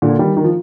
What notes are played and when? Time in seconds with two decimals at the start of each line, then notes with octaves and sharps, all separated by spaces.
0.02 A#2 D3
0.19 D#3 G3
0.37 D#3
0.44 F3